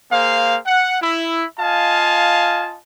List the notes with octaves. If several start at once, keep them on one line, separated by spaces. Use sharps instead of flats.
A#3 G#4 C5 F5
F#5
E4
F4 D#5 F5 G#5 A5